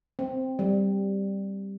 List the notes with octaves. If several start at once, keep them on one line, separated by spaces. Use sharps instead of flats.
C4
G3